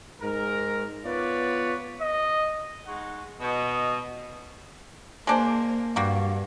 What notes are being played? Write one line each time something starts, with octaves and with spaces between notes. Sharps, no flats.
G#2 A#4
B3 F4 B4 C#5 D5
D#5
G#3 D#4 F#4 F#5
B2 D#5
G#3 A#3 D4 C5
G2 G3 A#3 F#4